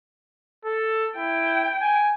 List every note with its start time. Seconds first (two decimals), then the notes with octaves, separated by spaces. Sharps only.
0.65 A4
1.17 E4 G5
1.81 G#5